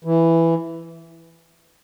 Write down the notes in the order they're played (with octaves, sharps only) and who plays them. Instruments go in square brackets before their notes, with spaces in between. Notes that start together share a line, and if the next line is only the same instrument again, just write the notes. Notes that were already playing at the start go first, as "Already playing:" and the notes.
[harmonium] E3